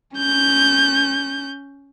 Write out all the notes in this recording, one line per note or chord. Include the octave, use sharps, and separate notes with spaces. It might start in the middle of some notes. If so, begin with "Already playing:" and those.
C#4 G6